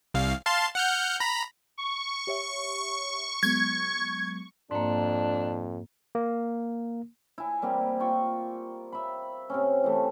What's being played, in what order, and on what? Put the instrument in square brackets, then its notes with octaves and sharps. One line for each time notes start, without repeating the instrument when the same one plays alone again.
[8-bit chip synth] C2 F5
F5 A5 C6
F#5 F6 G6
A#5 B5
[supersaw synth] C#6
[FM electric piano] G4 C#5 E5
[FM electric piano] F#3 G#3 B3 [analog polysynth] G#6
[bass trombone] F2 [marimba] G#2 A#3 [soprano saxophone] D4
[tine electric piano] A#3
[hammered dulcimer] E4 G#5
G3 A#3 C4 G4
F4 G5 C#6
E5 B5
C3 C4 C#4
E3 A3